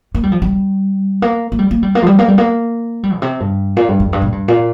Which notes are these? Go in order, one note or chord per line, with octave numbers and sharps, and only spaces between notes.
A#3
G3
F3
G3
A#3
A#3
G3
A#3
G3
A#3
F3
G3
A#3
G3
A#3
G3
A#2
C3
G2
A#2
G2
F2
G2
A#2
G2
A#2